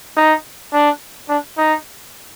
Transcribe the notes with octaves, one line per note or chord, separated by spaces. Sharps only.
D#4
D4
D4
D#4